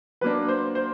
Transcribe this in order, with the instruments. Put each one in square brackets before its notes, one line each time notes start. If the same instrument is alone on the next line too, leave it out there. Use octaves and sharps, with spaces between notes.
[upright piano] F#3 A#3 D4 [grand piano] B4
[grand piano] C5
C5